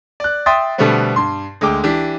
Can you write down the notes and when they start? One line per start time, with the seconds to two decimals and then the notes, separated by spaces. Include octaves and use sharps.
0.20 D5 F#6
0.46 E5 G5 C6 D#6 A6
0.78 B2 D3 G3 A3 B3 C4
1.16 G2 C6
1.61 D2 G#3 G5 D6
1.84 E3 D4 G4